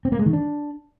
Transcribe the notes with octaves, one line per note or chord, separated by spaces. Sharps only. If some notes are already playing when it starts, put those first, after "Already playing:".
C4
A#3
G#3
D#3
D4